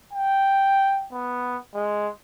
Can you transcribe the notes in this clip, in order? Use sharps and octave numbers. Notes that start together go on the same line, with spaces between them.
G5
B3
G#3